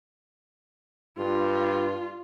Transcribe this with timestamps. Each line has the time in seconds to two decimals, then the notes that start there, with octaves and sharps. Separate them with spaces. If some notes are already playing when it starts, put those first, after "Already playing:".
1.18 G2 F4